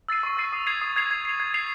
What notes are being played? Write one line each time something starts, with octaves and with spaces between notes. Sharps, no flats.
E6 A6 C7 D#7
C#6
E6 A6 C7 D#7
D#6
G#6 C7 F7
D#6
G#6 C7 F7
G#6
C7 F7
G#6
C7 F7